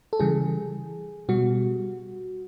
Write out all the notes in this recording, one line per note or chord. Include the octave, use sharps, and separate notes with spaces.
A4
C#3 E3 G3 G#4
B2 G3 F#4